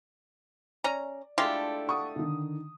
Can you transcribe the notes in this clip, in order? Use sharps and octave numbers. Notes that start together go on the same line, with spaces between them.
C#4 D5 A#5
G#3 A3 D4 E4 F4 G4
F#5 C#6 D#6
D3 D#3